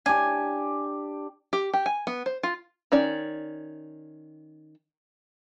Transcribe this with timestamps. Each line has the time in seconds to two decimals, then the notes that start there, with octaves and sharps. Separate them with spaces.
0.06 D4 G4 G#5
1.53 G4
1.73 G4
1.86 G#5
2.07 B3
2.26 C5
2.43 F4
2.92 D#3 C#4 D5